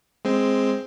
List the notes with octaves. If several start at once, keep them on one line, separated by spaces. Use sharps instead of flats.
G#3 C4